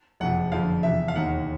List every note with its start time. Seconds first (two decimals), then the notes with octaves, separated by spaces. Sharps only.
0.20 F#1 F2 C3 F3 F#5
0.52 F#1 F2 D3 F3 F5
0.83 E2 C3 F3 E5
1.08 F5
1.15 E1 D#2 D#3 F#5